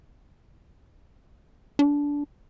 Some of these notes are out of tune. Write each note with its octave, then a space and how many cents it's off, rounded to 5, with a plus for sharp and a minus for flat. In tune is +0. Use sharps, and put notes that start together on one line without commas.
D4 -20